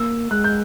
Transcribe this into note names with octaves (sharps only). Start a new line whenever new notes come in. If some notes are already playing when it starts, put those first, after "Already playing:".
Already playing: A#3 E6
G#3 F#6
G6